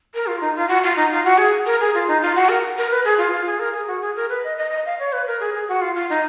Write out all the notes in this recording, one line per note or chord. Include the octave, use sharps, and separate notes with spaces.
A#4
F4
D#4
F4
F#4
F4
D#4
F4
F#4
G#4
A#4
G#4
F4
D#4
F4
F#4
A#4
A#4
B4
G#4
F4
F4
G#4
A#4
G#4
F#4
G#4
A#4
B4
D#5
D#5
D#5
F5
C#5
B4
A#4
G#4
G#4
F#4
F4
F4
D#4